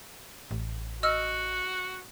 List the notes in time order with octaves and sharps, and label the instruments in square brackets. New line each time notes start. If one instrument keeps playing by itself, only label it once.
[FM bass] A1
[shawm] F#4 [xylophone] D#5 E6 F6